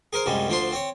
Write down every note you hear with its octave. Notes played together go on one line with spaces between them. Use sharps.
G#4 A#4 C5
C2 F#2 G3 G#3
D2 F3 D4 C6
C4 C#5